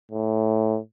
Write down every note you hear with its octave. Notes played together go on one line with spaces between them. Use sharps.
A2